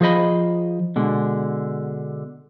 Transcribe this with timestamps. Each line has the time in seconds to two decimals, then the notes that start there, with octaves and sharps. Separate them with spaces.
0.01 F3 G#4 C5 D#5 B5
0.96 B2 D3 G#3